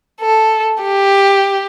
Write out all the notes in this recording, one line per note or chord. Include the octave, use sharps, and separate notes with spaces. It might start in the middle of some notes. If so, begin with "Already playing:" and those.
A4
G4